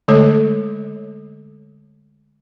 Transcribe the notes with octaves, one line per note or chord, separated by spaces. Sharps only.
D3 G#3 A3 A4 C#5